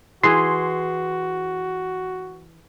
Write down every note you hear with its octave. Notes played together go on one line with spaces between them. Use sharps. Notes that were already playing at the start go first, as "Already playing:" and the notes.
E3 F#4 G#4 C6